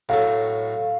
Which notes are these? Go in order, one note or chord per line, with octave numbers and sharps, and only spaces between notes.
A2 F#3 A3 F5